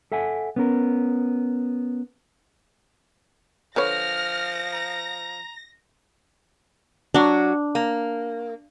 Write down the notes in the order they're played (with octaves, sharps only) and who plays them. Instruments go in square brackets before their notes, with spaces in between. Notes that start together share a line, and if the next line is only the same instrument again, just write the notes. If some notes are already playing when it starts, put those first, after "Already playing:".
[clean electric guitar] A4 E5 F#5 G#5
B3 C#4 A#4
[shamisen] D3 B4 C#5 [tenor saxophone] F3 [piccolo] F6 [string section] A#6
[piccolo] A#5
[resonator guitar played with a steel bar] F#3 F#4 [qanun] D4
[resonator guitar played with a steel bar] A#3